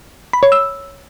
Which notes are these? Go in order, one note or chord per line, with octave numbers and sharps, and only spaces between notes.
B5
C#5
E6